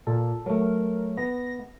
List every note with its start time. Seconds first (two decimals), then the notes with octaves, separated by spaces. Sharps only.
0.07 A#2 A4
0.46 F#3 A3 A#4
1.17 B3 A#6